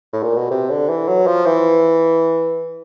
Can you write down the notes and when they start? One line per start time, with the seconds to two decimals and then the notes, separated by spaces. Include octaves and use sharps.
0.13 A2
0.23 A#2
0.37 B2
0.51 C3
0.70 D3
0.89 E3
1.08 F#3
1.27 F3
1.46 E3